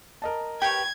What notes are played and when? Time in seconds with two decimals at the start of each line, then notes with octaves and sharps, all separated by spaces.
0.22 A#4 D#5 A5
0.62 G4 B4 C#5 G5 G#6